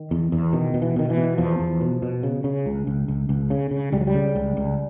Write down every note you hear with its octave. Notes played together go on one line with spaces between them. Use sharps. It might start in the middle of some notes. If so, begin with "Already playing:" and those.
Already playing: D#3
E2
E2
B2 D#3
B2
E3
B2 D#3
E3
B2
E2 F3
E2
B2
B2
C#3
C#3
C#2
C#2
C#2
C#2
C#3
C#3
C#2 G3
F#3
G3
C#3
C#2
C#2